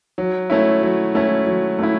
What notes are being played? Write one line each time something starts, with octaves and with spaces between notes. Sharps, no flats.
F#3
A3 C#4 E4
F#3
A3 C#4 E4
F#3
A3 C#4 E4